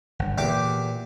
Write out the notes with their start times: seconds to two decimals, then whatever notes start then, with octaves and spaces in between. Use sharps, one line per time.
0.19 G1 D3
0.38 E2 A#2 G4 D6